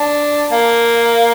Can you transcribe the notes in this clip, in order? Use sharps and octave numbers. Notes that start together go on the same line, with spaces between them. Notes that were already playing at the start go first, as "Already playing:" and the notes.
Already playing: D4
A#3